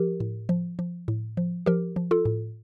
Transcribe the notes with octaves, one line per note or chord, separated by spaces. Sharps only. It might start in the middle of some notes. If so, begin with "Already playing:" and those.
Already playing: F3 G4 A#4
A2
F3
F3
A2
F3
F3 G4 A#4
F3
F4 A4
A2